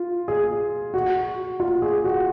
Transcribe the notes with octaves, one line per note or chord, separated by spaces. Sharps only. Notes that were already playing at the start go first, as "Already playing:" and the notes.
Already playing: F4
G#4
F#4
F4
G#4
F#4